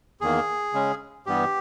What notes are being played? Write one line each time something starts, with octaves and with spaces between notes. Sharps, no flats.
E2 D#3 A#3 G#4
C#3 G#3 C#4
G2 E3 G3 B3 G4